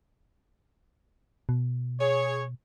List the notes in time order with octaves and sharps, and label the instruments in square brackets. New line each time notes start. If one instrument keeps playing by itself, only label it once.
[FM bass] B2
[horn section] G#4 C#5